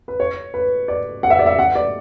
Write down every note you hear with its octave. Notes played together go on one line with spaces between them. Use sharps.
B4
C#5
B4
D5
F#5
E5
D5
E5
F#5
D5